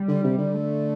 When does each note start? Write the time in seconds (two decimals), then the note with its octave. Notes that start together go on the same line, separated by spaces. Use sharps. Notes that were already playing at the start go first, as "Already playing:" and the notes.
Already playing: G3
0.08 D3
0.24 C3
0.38 D3
0.54 A3